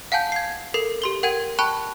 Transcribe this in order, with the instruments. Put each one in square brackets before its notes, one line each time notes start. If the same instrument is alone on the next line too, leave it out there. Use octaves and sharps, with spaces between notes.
[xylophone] F5 F#5 G#5 A5 G6
G#6 C7
A4 A#4 C7
G4 C6 G7
A#4 F#5 G5 G#6 D#7
G5 A5 B5 C#6 F#6